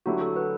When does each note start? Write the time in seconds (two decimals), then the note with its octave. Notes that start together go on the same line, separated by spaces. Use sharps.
0.06 D3 F#3 A3 E4 F#4 G4
0.21 A4
0.36 B4